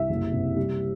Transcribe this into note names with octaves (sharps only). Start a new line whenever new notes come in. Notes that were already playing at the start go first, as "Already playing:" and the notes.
Already playing: C2 E5
F#1
C3
G3